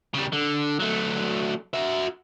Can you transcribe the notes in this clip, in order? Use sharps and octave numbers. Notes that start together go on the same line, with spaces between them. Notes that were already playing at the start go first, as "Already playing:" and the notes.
C#3 G3
D3
F#3 A3
F#4 E5